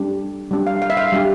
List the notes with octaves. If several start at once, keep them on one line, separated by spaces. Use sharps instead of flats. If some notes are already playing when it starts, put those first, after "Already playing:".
Already playing: G3 D4 G4
G3 D4 G4
F5
F5
E5
F5
G3 D4 G4